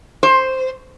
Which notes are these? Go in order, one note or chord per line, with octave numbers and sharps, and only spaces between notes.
C5